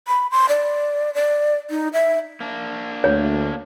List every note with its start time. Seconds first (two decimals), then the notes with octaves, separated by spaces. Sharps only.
0.08 B5
0.31 C6
0.49 D5
1.15 D5
1.70 D#4
1.93 E5
2.40 A#3 D4
3.04 D2 C#5